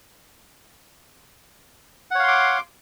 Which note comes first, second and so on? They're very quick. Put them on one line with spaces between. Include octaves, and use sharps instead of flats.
F#5 C#5 F5 C6 D6